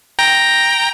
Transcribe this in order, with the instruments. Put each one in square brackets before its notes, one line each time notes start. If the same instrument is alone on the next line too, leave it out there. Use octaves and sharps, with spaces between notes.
[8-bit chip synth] G5 A#5